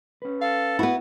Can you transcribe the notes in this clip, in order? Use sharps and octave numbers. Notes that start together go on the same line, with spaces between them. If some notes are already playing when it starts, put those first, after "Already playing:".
C#4 B4
A4 F5
B3 E4 F#4